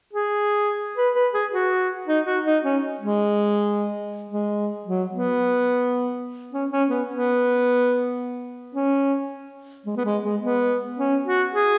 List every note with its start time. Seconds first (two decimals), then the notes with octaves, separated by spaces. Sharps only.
0.13 G#4
0.97 B4
1.15 B4
1.34 G#4
1.52 F#4
2.07 D#4
2.26 F#4
2.45 D#4
2.64 C#4
3.00 G#3
4.30 G#3
4.86 F#3
5.13 B3
6.53 C#4
6.71 C#4
6.89 B3
7.09 B3
8.75 C#4
9.86 G#3
9.96 B3
10.05 G#3
10.24 G#3
10.42 B3
10.98 C#4
11.25 F#4
11.53 G#4